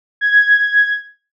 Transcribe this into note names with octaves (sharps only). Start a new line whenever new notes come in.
G#6